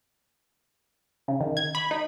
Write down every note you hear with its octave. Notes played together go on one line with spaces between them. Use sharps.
C#3
D#3
G#6
B5
D#4